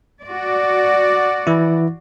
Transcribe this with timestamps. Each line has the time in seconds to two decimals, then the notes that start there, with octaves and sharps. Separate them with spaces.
0.23 F#4 D5
1.47 E3 E4